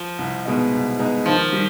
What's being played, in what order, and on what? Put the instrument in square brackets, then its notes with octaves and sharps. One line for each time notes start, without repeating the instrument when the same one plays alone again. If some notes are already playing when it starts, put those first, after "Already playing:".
Already playing: [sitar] F3
[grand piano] C2
B2 G#3 B3 D#4
C2
B2 G#3 B3 D#4
[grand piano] D#3 [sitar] F3
[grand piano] G3